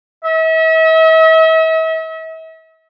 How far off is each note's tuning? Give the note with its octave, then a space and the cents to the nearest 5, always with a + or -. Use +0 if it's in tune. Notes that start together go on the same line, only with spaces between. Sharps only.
E5 -40